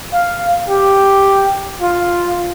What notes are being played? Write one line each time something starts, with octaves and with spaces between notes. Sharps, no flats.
F5
G4
F4